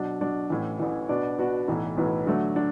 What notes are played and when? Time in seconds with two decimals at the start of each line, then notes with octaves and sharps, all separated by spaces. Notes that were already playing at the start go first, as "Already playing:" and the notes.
Already playing: B2 F#3 D4
0.21 B2 F#3 D4
0.50 A1 A2 E3
0.79 A1 A2 E3
1.09 B2 B3 D4 F#4 D5
1.38 B2 B3 D4 F#4 D5
1.68 B1 A2 E3 B3
1.97 B1 A2 E3 B3
2.26 D3 F#3 A3 D4
2.56 D4